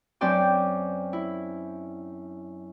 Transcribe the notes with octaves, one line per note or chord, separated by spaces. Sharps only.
F#2 C4 D4 D5 G5 D6
E4